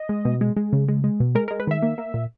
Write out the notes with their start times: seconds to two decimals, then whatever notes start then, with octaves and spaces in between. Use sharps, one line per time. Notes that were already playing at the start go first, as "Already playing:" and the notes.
Already playing: D#5
0.09 G#3
0.25 B2
0.41 G#3
0.56 G#3
0.73 C#3
0.88 G#3
1.04 G#3
1.20 B2
1.35 G#3 A#4
1.48 G#3 A#4
1.60 B4
1.67 D#3 E5
1.82 A#3
1.98 A#3
2.14 A#2